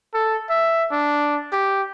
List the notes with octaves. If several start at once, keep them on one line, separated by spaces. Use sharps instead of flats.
A4
E5
D4
G4